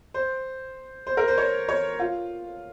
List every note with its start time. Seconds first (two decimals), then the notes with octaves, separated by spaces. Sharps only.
0.14 C5
1.07 C5
1.17 A#4
1.28 C5
1.38 C#5
1.69 C#5
1.99 F4